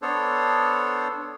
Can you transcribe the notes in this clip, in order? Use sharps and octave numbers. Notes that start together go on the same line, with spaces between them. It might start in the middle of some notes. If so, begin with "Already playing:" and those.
B3 D4 A4 C5 C#5